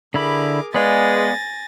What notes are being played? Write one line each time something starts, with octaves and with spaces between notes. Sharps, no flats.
D3 E4 G#4 A#4 B5 D6
G#3 B3 B4 D5 F5 G#5 A6 A#6